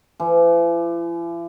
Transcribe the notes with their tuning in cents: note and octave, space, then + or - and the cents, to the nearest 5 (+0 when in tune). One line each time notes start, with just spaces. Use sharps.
E3 +45